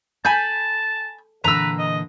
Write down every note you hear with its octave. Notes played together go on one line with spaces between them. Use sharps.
A4 G#5 A5 B5 G6
A#2 D3 E3 B4 A#5 E6
D#5